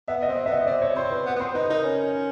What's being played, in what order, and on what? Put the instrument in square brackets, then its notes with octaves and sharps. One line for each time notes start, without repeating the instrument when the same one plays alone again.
[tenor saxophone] B3 [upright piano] E5
[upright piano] D#5
[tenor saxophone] C4
[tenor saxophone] B3 [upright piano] E5
[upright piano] D#5
[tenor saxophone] C4 [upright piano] D5
[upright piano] C#5
[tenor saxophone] C4 [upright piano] C5
[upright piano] B4
[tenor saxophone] B3
B3
[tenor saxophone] C4 [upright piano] C5
[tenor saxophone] D#4 [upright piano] B4
[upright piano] B4
[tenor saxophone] D#4 [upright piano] A#4
[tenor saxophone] C#4